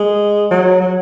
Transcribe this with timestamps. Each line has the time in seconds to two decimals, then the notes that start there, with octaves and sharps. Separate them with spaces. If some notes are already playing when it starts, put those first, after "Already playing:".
Already playing: G#3
0.51 F#3
0.81 F#3